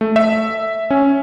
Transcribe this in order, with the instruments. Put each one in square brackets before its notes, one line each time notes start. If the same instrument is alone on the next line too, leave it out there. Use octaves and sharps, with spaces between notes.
[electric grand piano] A3
E5
C#4